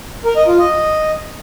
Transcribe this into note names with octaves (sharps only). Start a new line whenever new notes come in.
A#4
D#5
F4
D#5